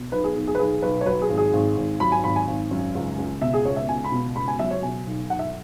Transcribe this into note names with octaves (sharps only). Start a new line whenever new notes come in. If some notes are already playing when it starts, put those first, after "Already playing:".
Already playing: B2
B1 B4
G#4
B1
G#4
B4
B1 G#4
B1 B4
C#5
F#3 B4
G#4
G#1
G#4
G#1
G#1
F#3 B5
G#5
G#1 B5
G#5
G#1
F#2
C#2
C#2
B2 E5
G#4
C#2 C#5
E5
C#2 G#5
B5
B2
C#2 B5
G#5
F#3 E5
C#5
B2 G#5
B1
B1 F#5
E5